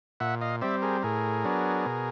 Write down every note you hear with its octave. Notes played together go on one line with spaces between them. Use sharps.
A#2 E5 F#5
D#5 F5
G3 C4 D5 E5
G#4 A#4
A2 G#4 A#4
F#3 B3 D4
B2